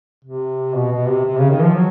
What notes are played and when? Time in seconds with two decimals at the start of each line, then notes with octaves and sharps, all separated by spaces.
0.24 C3
0.74 B2
0.92 B2
1.08 C3
1.25 C3
1.38 C#3
1.50 D#3
1.62 F3
1.75 F#3